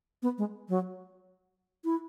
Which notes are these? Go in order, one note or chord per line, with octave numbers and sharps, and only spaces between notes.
B3
G#3
F#3
E4